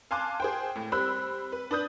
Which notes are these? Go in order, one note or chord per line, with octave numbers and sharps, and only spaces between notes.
F5 G#5 A5 C6 D6 F#6
G#4 C5 G5
A2
G3 C4 B5 E6 F#6
B4
D4 B4 D#6 G6